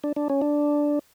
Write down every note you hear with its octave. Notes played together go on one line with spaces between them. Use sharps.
D4
D4
C#4
D4